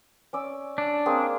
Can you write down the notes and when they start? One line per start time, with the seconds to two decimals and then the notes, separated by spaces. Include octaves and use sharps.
0.33 C#4 D5 E6
0.78 D4
1.06 A#3 C4 G#4